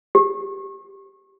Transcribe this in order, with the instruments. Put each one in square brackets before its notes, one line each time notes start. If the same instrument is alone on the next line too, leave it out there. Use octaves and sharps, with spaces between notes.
[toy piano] G4